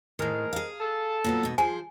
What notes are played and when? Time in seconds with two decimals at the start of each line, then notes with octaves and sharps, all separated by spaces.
0.19 A2 D#3 G#3 C4 A#4
0.53 G#4 F5
0.79 A4
1.24 A#2 F#3 B3
1.43 G#2 B2
1.58 F3 G#4 C5 G#5